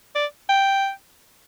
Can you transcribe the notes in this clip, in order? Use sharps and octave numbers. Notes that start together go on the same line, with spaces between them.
D5
G5